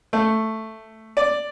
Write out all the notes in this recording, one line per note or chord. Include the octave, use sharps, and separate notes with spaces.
A3
D5